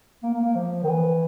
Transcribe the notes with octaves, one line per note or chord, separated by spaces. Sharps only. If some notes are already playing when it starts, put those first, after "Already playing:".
A#3
A#3
A#3
F3
D#3
E3